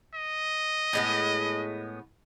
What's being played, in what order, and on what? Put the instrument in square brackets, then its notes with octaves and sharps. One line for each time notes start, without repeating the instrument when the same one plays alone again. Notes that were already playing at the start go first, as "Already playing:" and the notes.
[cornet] D#5
[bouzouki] A2 G#3 B3